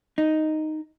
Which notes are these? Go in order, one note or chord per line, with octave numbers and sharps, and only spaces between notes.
D#4